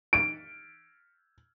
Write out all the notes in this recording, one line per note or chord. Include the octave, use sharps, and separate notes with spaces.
D7